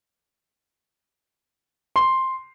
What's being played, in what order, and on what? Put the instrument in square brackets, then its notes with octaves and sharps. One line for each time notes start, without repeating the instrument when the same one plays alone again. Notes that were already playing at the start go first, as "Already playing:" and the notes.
[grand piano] C6